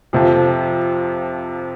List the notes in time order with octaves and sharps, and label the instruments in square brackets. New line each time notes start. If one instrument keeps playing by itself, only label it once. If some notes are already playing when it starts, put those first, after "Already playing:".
[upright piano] F2 C3 F3